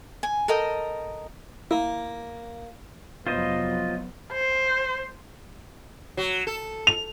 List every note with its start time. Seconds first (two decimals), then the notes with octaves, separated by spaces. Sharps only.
0.23 G#5
0.48 A4 A#4 D#5 G5
1.71 A#3 E4
3.27 F1 F#3 B3 F4 C5 D#5
4.32 C5
6.17 F#3
6.47 A4
6.87 F7